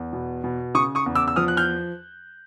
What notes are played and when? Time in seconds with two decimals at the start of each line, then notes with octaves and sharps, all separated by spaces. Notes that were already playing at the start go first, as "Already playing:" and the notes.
Already playing: E2
0.13 B2
0.44 B2
0.75 C#3 C#6 D#6
0.95 C#6 D#6
1.06 E2
1.15 D6 E6
1.28 E6
1.36 F3 D#6 F6
1.48 F#6
1.57 F6 G6